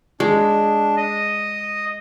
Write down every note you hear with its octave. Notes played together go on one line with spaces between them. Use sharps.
G#3 D4
D#5